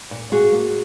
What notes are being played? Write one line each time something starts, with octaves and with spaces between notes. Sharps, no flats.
A#2
A#2 F#4 G#4
A#3